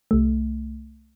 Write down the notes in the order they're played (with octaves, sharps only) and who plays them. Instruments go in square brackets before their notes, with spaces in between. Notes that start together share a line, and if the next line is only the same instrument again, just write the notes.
[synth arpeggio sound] C2 A3